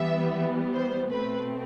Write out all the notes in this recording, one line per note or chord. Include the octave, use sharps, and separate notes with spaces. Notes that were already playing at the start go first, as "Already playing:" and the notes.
Already playing: E3 G3 B3 E5
C5
B2 A3 C4 B4